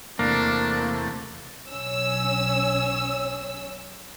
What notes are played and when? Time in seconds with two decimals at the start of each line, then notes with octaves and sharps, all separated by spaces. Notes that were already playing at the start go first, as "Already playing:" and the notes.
0.19 E2 C3 A3 A#3 D4
1.71 B1 C#4 E6